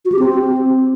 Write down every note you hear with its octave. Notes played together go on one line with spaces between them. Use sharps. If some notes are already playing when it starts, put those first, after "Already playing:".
F#4
G4
C4